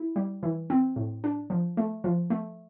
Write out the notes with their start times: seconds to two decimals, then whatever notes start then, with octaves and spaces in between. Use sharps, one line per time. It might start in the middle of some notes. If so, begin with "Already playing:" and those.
Already playing: E4
0.16 G3
0.43 E3
0.70 C4
0.96 A2
1.24 D4
1.50 F3
1.77 A3
2.04 F3
2.30 A3